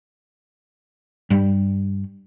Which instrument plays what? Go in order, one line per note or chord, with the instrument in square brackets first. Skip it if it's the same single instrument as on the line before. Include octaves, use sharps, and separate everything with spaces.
[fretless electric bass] G2 G3